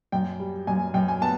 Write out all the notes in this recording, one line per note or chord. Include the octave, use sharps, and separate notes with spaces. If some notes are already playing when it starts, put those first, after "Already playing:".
F#2 G5
G3
F#2 G#5
F#2 G5
G#5
B3 A5